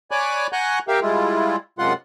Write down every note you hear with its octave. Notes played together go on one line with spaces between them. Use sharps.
C#5 D5 G#5 B5 D6 F#6
F#5 G#5 A#5 C#6 F#6 G6
G4 A#4 E5 F5 G5
G3 G#3 E4 F4
F#2 C3 G#3 F4 F#5 C6